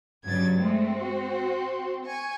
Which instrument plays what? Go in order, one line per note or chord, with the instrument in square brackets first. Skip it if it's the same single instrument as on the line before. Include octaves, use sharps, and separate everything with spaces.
[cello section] G2 C#3 F#3 [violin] G#6 A6
[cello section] G#3 A3 [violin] C4
[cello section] F#4
[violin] G#5 C#6